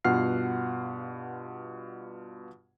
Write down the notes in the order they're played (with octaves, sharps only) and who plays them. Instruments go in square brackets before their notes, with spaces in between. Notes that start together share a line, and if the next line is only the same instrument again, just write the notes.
[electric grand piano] G2 B2 F4 F#5 F6 C7